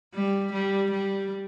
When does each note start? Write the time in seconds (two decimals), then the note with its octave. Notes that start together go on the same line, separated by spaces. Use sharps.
0.15 G3
0.53 G3
0.91 G3